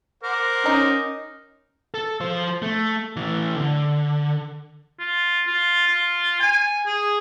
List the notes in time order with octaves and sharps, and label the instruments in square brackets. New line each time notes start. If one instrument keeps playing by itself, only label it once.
[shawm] A#4 [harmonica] C5 F#5 D6
[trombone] C#4 [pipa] D#4
[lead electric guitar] A4
F3 C5
A3
E3 A3
D3
[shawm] F4
F4
F4
G#5
G#4